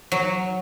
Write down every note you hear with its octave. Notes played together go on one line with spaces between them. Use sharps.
F#3